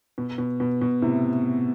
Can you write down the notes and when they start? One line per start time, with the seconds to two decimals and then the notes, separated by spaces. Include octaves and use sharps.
0.18 B2
0.38 B2
0.60 B2
0.81 B2
1.02 A2 C3